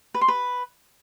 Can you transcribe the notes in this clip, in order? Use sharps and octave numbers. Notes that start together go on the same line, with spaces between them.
B4
C6
B4